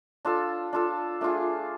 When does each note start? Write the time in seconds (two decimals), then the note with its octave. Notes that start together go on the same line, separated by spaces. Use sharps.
0.25 D4 F4 A4
0.73 D4 F4 A4
1.21 A3 D4 F4 G#4